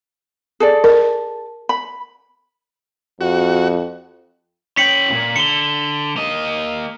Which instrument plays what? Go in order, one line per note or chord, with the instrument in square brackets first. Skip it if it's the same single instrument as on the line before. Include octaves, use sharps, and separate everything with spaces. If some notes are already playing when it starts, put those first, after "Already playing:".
[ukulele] G#4 A4 D5
[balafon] A#4
[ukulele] B5
[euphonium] F2 [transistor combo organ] F#4
[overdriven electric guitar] C#4 G5 [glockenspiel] B6 C#7 F#7
[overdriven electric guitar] E2 A#2
[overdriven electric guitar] D3 [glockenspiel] C#7 G7
[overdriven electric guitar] A#3 D#5